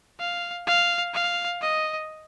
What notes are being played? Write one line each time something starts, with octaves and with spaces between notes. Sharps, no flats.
F5
F5
F5
D#5